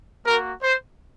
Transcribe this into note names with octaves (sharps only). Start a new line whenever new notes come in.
A#3 F#4 A#4
C5